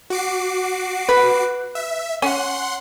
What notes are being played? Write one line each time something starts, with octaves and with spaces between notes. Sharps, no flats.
F#4 D6 C7
B4
E5
C#4 F#5 C6